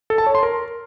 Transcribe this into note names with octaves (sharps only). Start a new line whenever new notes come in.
A4
A5
C#5
C6
A#4